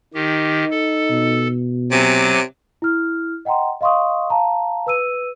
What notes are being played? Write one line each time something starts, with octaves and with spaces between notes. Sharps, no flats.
D#3 D#4 G4
A4
B2
C3 F#3 G#5 D6
E4 F6
D#5 F#5 G5 A#5 C6
D#5 F5 C6 C#6 D#6
F5 A5 A#5
B4 E6 D#7